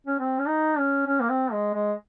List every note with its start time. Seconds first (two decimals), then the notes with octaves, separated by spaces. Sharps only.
0.07 C#4
0.19 C4
0.39 C#4
0.48 D#4
0.78 C#4
1.07 C#4
1.20 A#3
1.30 C4
1.52 G#3
1.74 G#3